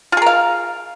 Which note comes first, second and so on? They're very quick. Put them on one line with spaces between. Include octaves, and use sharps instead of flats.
F4 G#4 A#4 F5